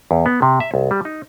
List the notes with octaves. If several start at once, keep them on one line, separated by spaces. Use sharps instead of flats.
E2
B3
C3
E5
C2
G3
D#4